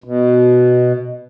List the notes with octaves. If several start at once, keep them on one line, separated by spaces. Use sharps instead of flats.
B2